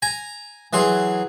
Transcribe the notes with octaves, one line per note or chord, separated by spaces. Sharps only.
G#5 A#5
E3 F#3 G#4 C6